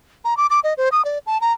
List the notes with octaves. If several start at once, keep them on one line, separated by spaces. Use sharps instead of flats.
A#5
D6
D6
D#5
C5
D#6
D5
A5
A#5